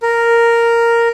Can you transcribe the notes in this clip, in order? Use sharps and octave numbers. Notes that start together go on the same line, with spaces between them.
A#4